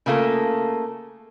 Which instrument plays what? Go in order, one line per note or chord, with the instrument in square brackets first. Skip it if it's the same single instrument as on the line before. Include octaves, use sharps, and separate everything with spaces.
[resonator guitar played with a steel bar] C#3 A3 A#3 F4 A4